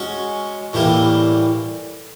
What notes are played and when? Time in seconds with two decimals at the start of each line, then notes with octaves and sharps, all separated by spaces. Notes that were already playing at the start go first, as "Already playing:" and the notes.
Already playing: G#3 C#4 F#4
0.73 A2 E3 G3 A#3